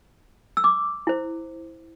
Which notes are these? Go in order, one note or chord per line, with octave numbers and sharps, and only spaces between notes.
E6
D6
E4 C5